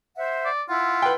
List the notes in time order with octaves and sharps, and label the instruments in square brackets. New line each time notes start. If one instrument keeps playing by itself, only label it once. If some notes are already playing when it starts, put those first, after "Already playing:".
[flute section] C5 E5 F#5
[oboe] D5
[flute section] E4 F#5 [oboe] F4
[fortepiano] B4 G5